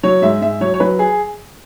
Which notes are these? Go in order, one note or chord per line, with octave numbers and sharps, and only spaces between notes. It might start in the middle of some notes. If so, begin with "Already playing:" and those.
F#3 C#5
G#2 E5
G#2 E5
F#3 C#5
C#5
F#3 B4
G#4